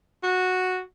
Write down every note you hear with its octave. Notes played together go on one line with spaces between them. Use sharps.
F#4